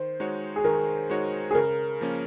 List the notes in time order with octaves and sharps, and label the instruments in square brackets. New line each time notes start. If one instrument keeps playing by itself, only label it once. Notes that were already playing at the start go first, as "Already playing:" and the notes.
Already playing: [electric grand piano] D#3 [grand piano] C5
[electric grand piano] G#3 D#4 F#4 C#5
[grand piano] G#4
[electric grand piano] D#3 [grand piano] A#4
[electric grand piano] G#3 D#4 F#4 C#5
[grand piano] G#4
[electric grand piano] C#3 [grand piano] A#4
[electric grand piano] F3 A#3 C#4